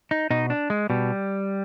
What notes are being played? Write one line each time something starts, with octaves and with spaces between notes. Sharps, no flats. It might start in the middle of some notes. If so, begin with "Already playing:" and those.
D#4
B2 D#4
D4
G#3
B2 G3